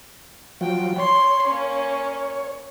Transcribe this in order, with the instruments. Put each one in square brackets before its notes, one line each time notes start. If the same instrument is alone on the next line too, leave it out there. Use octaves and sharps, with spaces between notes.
[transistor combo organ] F3 F#3 [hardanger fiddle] G5
[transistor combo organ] C#5 [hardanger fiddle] C6
[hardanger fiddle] A#3 C#4